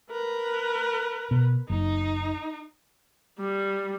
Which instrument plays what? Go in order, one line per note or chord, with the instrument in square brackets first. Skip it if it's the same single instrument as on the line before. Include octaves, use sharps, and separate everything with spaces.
[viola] A#4 B4
[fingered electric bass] B2
[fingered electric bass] F#1 [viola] D#4
[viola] G3